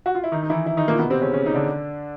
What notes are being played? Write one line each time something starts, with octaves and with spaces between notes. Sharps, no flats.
F#4
F4
E4
D#3 D#4
D#4
E3 E4
E3 E4
D#3 D#4
A#2 A#3
B2 B3
C3 C4
C#3 C#4
C#3 C#4
D#4
D3 D4